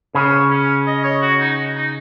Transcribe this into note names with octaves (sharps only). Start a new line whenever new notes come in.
C#3 C#5
C#4
D#5
C#5
F#4
D#4
D#4